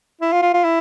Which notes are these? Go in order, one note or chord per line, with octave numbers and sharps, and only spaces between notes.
E4
F4
F4
F4
E4